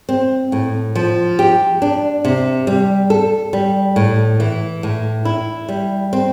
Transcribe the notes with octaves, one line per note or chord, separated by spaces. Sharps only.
C4
A2
F3
G4
D4
C3
G3
A4
G3
A2
E3
A2
E4
G3
C4